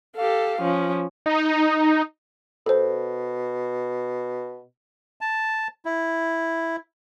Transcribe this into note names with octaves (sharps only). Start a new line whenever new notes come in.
G4 A4 F5
F3 C#4
D#4
B2 A4 C5
A5
E4